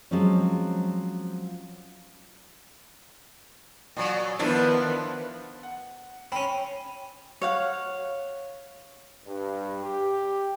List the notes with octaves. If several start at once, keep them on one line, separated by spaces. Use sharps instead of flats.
F3 F#3 G#3 C4 C#4
A#2 F#3
D#3 F3 B3 D4 E4
F#5
C4 C#4 B5
C#5 F5 F#5
G2
G4